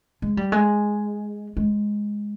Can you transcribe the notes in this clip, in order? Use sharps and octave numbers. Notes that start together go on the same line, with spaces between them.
G#3
G3
G#3
G#3